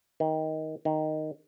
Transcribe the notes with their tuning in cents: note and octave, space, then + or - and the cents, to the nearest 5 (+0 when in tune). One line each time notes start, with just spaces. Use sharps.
D#3 +15
D#3 -5